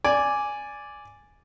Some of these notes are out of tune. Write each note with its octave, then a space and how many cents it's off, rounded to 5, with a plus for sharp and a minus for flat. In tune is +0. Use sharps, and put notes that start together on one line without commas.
D5 -5 G#5 +0